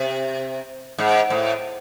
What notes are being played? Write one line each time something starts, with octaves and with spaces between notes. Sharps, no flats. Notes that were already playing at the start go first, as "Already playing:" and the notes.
Already playing: C3
G#2
A2